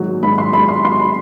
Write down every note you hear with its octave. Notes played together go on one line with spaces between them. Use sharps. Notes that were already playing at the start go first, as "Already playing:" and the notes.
Already playing: A#1 G#2 D#3 F#3
G#2 B5
C6
G#2 B5
C6
F#3 C6
B5